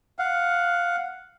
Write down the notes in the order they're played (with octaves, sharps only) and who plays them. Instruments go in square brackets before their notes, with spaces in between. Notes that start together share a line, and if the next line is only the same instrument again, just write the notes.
[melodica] F5 F#5